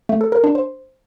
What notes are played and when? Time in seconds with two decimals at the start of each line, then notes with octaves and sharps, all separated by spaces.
0.09 A3
0.21 A4
0.32 A#4
0.44 D4
0.55 C5